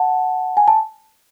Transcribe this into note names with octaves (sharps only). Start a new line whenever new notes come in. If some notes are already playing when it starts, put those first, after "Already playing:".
Already playing: F#5 A5
G#5
A5